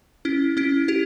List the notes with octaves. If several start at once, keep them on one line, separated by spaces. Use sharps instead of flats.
C#4 E4
C#4 E4
E4 G4